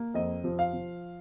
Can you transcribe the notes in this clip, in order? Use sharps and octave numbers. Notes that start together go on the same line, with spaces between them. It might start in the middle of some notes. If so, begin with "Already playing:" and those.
Already playing: A#3
F2 D#5
F3
F5
F3